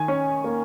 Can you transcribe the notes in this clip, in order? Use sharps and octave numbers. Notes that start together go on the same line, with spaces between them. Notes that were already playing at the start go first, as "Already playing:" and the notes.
Already playing: D#3 G#5
C#4
A#3